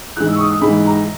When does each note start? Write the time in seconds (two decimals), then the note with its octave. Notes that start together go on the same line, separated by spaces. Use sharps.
0.17 G#2 E3 F#6
0.28 E6
0.36 C#6
0.39 D#6
0.51 D#6
0.62 G#2 E3 B5
0.86 A#5